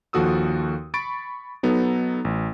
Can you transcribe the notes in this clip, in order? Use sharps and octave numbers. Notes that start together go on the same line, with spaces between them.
D#2 F3 F#4 A4 D#6 E6
B5 C#6 A6 D7
F#3 B3 D#4 A4
A1